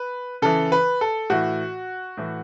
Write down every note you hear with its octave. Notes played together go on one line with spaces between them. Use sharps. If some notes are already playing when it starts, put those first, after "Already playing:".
Already playing: B4
C#3 E3 A4
B4
A4
A2 E3 F#4
A2 E3